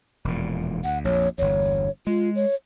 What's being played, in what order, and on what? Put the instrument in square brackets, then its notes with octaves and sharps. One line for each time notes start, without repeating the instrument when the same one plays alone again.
[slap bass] E1 F2 A#2
[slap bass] D2 [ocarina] F#5
[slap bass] A#1 F2 [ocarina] C#5
[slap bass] G1 E2 [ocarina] C#5
[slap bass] G#3 [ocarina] F4
[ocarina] C#5